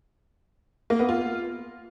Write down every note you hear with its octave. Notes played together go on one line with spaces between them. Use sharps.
A#3
B3
F4